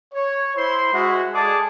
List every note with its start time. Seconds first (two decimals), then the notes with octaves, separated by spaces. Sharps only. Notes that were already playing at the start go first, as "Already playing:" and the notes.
0.14 C#5
0.56 E4 C5 C6
0.93 G#3 F#4 E5
1.34 G#3 G#4 A4 D5 A5 D6